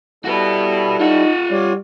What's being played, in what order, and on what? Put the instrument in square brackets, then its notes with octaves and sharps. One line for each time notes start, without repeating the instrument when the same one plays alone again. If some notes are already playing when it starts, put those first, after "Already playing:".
[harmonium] G3 E4 A4 [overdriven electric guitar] F#4 B4
[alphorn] D#4 [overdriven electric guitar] F4 F#5
[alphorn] G3 [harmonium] C#5 D5